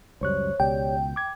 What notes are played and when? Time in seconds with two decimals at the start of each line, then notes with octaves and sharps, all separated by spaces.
0.21 C#2 F#2 G3 C5 C#5 C#6 F#6
0.60 C#2 B2 G4 D5 G5
1.16 D6 G#6